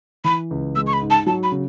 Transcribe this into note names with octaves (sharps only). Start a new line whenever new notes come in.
E3 B5
C#2
G#3 E6
C#6
B5
G#2
A5
F#3 A5
B5
C#3